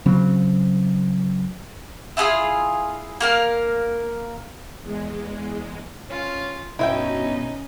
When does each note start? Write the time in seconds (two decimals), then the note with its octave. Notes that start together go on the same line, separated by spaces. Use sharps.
0.06 C#3 F#3 C4
2.17 E4 F4 G4 G#4
3.20 A#3 A#4 F5
4.81 E2 G#3
6.10 C#4 F4
6.79 G2 B2 C#4 D#4 E4 E5 G5